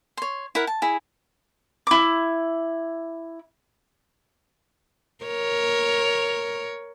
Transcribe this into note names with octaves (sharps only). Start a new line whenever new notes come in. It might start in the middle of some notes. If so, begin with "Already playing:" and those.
C#5 C6
E4 A#4 F#5
A5
E4 G#4
E4 D6
A#4 C#5